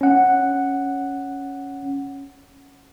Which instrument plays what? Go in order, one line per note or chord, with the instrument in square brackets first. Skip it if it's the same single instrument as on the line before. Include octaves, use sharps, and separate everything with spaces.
[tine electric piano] C#4 F#5